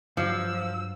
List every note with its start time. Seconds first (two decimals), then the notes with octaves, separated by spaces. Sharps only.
0.17 G2 F3 F#3 E6